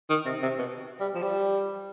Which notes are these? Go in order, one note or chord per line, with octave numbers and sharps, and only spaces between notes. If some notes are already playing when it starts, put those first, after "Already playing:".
D#3
C3
C3
B2
G3
F3
G3